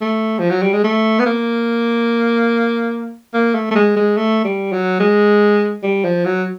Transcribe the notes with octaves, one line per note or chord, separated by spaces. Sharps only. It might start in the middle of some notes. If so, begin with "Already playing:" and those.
A3
F3
F#3
G3
G#3
A3
B3
A#3
A#3
A3
A3
G#3
G#3
A3
G3
F#3
G#3
G3
F3
F#3